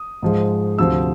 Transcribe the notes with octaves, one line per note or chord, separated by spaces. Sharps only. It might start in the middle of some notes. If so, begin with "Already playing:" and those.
Already playing: D#6
G#2 F3 G#3
D2 C3 F3 E6